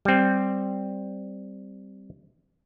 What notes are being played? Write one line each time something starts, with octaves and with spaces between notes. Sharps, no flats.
G3 C4